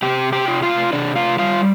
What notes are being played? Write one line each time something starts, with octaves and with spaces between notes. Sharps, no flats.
C3 G4 G5
G4 G5
F4
F4 F5
C3 D4 D5
F4 F5
G3 F4 F5